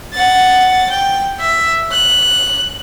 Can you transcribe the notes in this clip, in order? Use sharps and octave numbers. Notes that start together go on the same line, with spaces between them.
F#5 A6
G5
E5
F#6